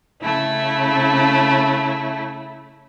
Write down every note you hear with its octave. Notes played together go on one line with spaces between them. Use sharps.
C#3 A3 E4